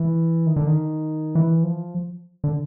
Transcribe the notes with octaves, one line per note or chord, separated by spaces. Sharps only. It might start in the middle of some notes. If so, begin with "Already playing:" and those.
Already playing: E3
D#3
D3
D#3
E3
F3
D3